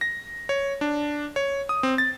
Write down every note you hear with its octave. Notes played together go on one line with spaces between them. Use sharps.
A#6
C#5
D4
C#5
D#6
C4
A6